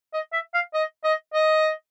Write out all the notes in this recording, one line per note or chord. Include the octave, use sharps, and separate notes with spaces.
D#5
E5
F5
D#5
D#5
D#5